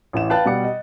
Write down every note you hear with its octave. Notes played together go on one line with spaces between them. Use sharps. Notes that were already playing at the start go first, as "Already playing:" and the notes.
A1 E3 E7
B4 F5 G5 A5 F#6 A6
B2 G3 F#5 D6 C#7
D#5